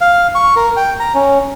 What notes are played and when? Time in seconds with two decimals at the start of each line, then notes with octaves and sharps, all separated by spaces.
0.01 F5
0.35 C#6
0.56 A#4
0.77 G5
1.00 A#5
1.14 C#4